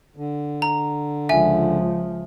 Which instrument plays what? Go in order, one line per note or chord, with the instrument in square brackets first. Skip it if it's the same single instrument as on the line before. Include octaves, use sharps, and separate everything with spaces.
[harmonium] D3
[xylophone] A#5
[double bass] C#2 F3 [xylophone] E5 G#5